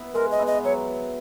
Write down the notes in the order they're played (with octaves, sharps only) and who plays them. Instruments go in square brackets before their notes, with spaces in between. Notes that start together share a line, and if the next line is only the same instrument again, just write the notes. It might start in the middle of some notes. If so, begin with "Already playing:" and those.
Already playing: [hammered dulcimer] B3 E4
[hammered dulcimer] G#3 [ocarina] A#4
[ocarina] D#5
[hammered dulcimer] B3 E4
[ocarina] D#5
[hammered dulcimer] F#3 [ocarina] C#5